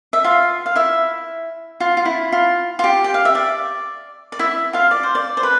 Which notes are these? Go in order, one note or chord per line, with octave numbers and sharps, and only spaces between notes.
E5
F4 F5
F5
E4 E5
F4
F4
E4
F4
F4
G4
G5
F5
E5
D5
D5
E4 E5
F4 F5
D5
C5
D5
C5
B4